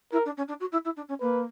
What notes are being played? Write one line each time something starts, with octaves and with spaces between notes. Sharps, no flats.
E4 A#4
D4
C#4
D4
F#4
E4
E4
D4
C#4
A#3 B4